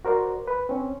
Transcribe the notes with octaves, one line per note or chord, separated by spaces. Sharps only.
F#4 A#4 C5 D5
B4
C4 C#4